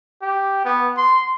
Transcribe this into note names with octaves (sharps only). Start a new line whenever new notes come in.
G4
B3
C6